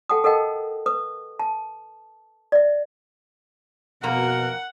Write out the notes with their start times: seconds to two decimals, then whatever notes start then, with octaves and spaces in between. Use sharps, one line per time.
0.09 A4 F#5 G5 A5 D#6
0.24 A4 A#4 D#5 F#5 G5 A5
0.86 B4 D#6
1.39 A5
2.52 D5 E5
4.03 F2 B2 A#3 A#4 F#5 A#5